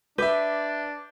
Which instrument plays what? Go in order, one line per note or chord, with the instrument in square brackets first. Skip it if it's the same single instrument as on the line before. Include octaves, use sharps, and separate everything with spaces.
[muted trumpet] D4 [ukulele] B4 [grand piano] E5 D6 G6